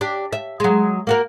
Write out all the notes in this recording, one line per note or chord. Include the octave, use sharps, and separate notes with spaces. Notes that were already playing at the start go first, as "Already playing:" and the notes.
D4 G4
E5
F#3 G#3
A#3 F#4 A#4